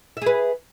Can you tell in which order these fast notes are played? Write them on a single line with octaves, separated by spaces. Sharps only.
E5 G#4 B4